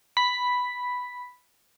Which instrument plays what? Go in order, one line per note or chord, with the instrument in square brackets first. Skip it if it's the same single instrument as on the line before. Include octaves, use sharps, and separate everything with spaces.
[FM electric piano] B5 B6